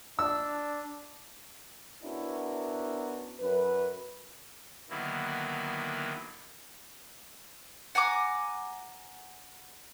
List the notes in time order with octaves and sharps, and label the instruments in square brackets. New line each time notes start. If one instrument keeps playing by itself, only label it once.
[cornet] D4 [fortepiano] E6
[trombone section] B3 C#4 D4 E4 F#4 A#4
F#2 B4
[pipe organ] D3 D#3 F#3 A#3 B3 E4
[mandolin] F#5 G#5 A#5 D6